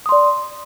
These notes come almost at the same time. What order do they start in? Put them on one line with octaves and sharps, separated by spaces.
D#6 C6 D5